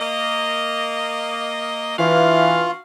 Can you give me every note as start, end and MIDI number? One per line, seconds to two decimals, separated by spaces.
0.01 1.94 58
0.01 1.94 75
1.99 2.67 52
1.99 2.77 62
1.99 2.71 65
1.99 2.77 66
1.99 2.77 77